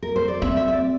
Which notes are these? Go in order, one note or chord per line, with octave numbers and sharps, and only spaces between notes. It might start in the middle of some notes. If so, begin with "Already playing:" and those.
A#4
C5
D5
C4 E5
E5
E5
D5